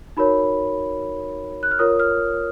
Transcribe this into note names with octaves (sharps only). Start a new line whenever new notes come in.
D#4 F#4 A#4 C#5 B5
F#6
F6
F4 A#4 C#5 D#6
F6